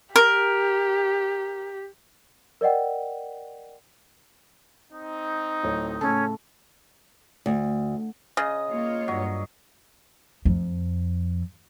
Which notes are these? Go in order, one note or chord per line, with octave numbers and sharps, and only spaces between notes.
G4 A#4
A#4 D5 D#5 F#5 G5
C4 D#4
D1 C#5
A2 C#3 C#4 A4
D2
C#3 D#5
A#3 F4 C#5
G2 F#3
F2